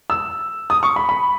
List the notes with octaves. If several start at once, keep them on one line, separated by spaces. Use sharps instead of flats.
E6
D#6
C#6
B5
B5